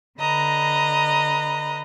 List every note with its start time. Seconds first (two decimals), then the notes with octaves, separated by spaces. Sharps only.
0.20 D3 B4 D#5 A#5